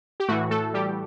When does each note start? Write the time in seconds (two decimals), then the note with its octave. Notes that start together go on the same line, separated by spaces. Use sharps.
0.20 G4
0.28 A2 E3 A3 F#4
0.51 A3 A4
0.74 G3 G4